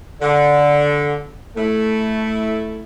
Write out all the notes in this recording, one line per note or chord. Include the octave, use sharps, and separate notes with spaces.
D3
A3 E4